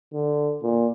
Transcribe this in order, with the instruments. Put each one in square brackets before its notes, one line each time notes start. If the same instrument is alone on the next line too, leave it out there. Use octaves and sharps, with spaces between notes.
[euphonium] D3
A#2